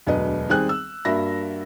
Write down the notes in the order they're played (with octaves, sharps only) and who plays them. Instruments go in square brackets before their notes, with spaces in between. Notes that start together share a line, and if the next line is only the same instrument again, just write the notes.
[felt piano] E1 D2 F#3 B4 D#5
D#3 G3 C4 G#4 G#5 F#6
E6
G2 A#3 F#4 E5 B5 A#6